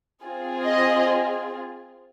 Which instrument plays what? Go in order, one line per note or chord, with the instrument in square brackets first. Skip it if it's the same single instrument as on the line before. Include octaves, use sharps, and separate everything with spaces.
[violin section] C4 F4 G#4
D#5